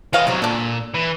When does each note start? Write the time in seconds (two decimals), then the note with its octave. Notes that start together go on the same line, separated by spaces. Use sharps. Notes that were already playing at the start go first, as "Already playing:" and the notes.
0.13 E3 B3 C#5 D#5 F5
0.27 C2 C3 F#3 D#4
0.42 A#2 D4 A4
0.94 E3